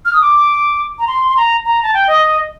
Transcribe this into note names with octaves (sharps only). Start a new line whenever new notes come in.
F6
D#6
D6
A#5
C6
C6
A#5
A#5
A5
G5
D#5